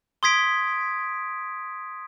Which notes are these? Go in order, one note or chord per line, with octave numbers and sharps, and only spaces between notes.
C6 D#6 G#6 B6 D7